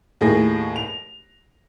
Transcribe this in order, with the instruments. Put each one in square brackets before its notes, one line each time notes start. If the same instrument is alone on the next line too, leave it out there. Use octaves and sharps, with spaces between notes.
[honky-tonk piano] D#2 A2 G#4 A#6
F7